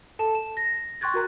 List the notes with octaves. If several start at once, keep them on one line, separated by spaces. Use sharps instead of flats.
A4 A5 E7
E7
A#6
G5 C6 C#6 F#6 G#6 A6
F#4 A#4 A#5 F#6